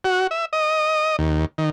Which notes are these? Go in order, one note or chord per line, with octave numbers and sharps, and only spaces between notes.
F#4
E5
D#5
D#2
D#3